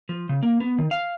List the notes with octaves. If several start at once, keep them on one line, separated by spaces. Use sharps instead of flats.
F3
C#3
A#3
B3
D#3
F5